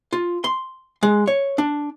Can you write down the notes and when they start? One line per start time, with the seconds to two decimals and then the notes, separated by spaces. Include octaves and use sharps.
0.12 F4
0.44 C6
1.03 G#3
1.27 C#5
1.58 D4